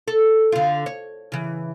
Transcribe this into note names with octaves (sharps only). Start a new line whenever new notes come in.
A4
D3 F4
C#5
C#3 E3